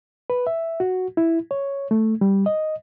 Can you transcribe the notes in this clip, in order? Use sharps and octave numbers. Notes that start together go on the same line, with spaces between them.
B4
E5
F#4
E4
C#5
A3
G3
D#5